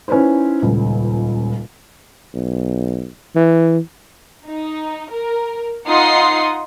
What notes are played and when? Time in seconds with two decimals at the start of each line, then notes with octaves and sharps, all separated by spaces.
0.08 C#4 D#4 E4 B4 C5
0.62 D#1 C#2
2.34 B1
3.35 E3
4.46 D#4
5.13 A#4
5.87 D#4 F4 F#5 C6 D#6 C7